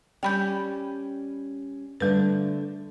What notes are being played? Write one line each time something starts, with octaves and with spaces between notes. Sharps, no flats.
G3 C#4 D5 G5 B5 G6
D3 G3 A3 D4 B4